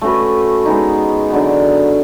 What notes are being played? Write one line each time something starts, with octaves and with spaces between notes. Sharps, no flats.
A3 C#4 F#4 B4
G#3 B3 D#4
D3 F#3 B3